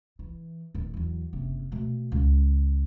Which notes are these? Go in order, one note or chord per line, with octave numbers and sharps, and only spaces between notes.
E3
D1 D#3
E2 F#3
F#1 C3
B2 A3
C#2